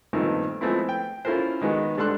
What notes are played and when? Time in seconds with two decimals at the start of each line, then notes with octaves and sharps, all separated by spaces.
0.13 G2 A#2 D#3 A3 B3 C4
0.61 F3 G#3 A3 B3 C4 E4
0.89 G5
1.25 C#4 E4 F4 A4 A#4 C5
1.61 D#3 G#3 B3 F#4
1.97 G#2 G3 D4 A4 C6 F#6